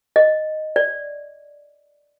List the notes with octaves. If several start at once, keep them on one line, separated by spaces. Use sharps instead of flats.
D#5
D5